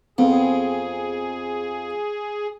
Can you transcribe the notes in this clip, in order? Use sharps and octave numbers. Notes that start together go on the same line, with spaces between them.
F2 B3 C4 G#4